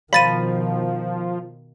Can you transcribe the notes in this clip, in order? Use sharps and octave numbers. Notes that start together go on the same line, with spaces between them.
B2 D#3 F3 F5 B5 A6 D#7